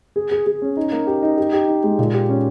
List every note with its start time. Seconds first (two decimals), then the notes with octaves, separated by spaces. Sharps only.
0.16 G#4
0.31 G#4
0.46 G#4
0.62 C#4
0.77 D#4
0.92 A#3
1.07 G4
1.22 D#4
1.37 G4
1.53 G4
1.68 D#4
1.84 G#3
1.98 A#2
2.14 G4
2.29 C#4